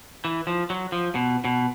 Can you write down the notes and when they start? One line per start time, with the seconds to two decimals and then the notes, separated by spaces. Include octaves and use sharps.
0.25 E3
0.47 F3
0.70 F#3
0.92 F3
1.15 B2
1.45 B2